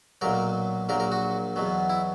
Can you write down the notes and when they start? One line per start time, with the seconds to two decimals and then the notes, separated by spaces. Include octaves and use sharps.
0.21 B1 A#2 F#3 A#4
0.89 A#1 A#2 F#3 A#4
1.00 A#4
1.12 F#4
1.56 E2 B2 F#3
1.90 E4